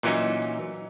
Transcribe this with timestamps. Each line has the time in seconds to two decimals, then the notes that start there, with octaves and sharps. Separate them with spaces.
0.03 A#2 E3 F#3 C#4 D#4